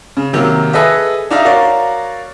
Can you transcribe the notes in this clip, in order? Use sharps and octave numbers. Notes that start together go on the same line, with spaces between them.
C#3
C3 D#3 F#3 A#3
G#4 A4 B4 D#5 E5
D4 D#4 E5 F5 A#5
F#4 A#4 C#5 D5 F5